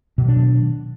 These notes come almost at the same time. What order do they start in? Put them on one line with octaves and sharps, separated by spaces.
B2 D#3 F#3 D4